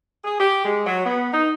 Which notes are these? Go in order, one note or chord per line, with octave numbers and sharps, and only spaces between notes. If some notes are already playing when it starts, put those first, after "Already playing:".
G#4
G4
G#3
F#3
B3
D#4